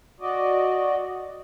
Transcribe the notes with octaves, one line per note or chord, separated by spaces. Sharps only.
F#4 D5 D#5